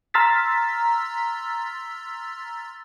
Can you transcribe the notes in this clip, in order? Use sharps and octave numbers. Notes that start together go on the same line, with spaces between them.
A#5 C6 E6 F6 A6 B6